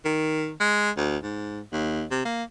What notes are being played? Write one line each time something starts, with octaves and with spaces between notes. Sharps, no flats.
D#3
G#3
D2
G#2
D#2
C3
A#3